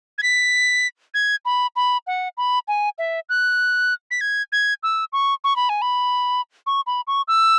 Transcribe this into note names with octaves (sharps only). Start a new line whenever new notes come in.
G#6
B6
G#6
B5
B5
F#5
B5
G#5
E5
F#6
B6
G#6
G#6
E6
C#6
C#6
B5
G#5
B5
C#6
B5
C#6
E6